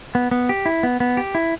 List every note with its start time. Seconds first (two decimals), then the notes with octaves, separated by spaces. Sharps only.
0.15 B3
0.31 B3
0.49 G4
0.66 E4
0.83 B3
1.00 B3
1.17 G4
1.35 E4